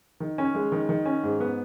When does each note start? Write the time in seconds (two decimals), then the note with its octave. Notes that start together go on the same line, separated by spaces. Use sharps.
0.20 D#3
0.38 C#4
0.55 G#3
0.72 D#3
0.89 D#3
1.06 C#4
1.23 G#2
1.40 B3